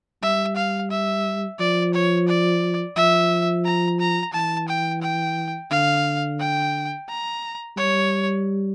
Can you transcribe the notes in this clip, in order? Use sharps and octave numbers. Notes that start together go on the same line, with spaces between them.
G3 E5
F5
E5
F3 D5
C#5
D5
F3 E5
A#5
A#5
E3 A5
G5
G5
D3 F5
G5
A#5
G3 C#5